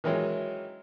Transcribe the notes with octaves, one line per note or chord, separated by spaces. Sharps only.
D#3 E3 F#3 G#3 C#4